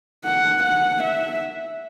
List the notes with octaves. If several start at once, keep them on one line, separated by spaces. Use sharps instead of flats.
F#5
F#5
E5